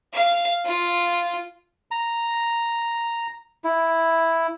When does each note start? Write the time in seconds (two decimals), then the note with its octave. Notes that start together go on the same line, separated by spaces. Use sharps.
0.13 F5
0.65 F4
1.91 A#5
3.64 E4